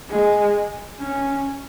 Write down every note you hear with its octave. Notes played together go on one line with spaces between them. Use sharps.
G#3
C#4